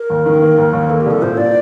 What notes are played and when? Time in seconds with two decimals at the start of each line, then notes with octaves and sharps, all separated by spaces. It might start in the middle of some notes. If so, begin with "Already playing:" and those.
Already playing: A#4
0.10 D#2
0.26 D#3
0.42 A#3
0.58 D#2
0.73 D#2
0.89 A#3 A4
1.00 G4
1.06 C2
1.11 A4
1.22 A#2 C5
1.38 A#2 D5